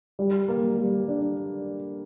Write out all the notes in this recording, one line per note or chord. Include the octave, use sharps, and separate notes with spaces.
G3
A#3
G3
D4